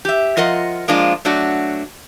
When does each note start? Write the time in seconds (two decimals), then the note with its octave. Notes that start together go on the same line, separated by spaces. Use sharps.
0.05 G4 E5
0.37 F3 F4 A#4 D#5 F#5
0.88 F3 G#3 A#3 D4 F4
1.25 F#3 A3 D4 F#4